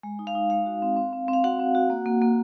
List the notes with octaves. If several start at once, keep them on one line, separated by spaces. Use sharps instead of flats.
G#3
D#4
F5
D#4
G#3 F5
F#4
C4
C4
C4
C4
F5
F#4 F#5
C4
F#4
A#3
A#3
A#3